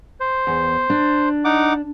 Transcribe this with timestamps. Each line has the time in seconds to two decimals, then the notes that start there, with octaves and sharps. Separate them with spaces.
0.20 C5
0.47 E2
0.90 D4
1.45 D#4 F#5 D6